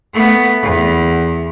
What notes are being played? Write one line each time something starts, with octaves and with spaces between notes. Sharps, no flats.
A3 B3
E2